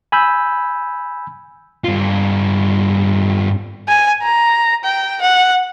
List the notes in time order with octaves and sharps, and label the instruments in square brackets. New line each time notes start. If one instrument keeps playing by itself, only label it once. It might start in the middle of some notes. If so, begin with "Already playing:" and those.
[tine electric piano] G#5 B5 E6 G6
[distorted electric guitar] G2 F4
[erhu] G#5
A#5
G5
F#5